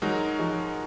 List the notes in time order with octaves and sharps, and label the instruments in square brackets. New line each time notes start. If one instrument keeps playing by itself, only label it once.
[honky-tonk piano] F#3 [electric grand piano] G#3 D#4 F#4 A#4
[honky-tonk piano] F3 G#3